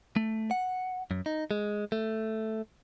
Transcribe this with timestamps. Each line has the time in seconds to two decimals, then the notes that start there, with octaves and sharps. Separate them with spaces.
0.16 A3
0.51 F#5
1.11 F#2
1.26 D#4
1.51 G#3
1.92 A3